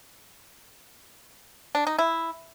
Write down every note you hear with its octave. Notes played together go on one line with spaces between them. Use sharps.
D4
D#4
E4